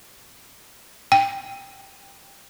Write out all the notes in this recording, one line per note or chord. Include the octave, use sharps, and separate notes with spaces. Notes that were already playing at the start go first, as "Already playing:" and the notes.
G5